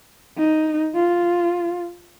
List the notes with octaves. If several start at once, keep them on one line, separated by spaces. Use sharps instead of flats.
D#4
F4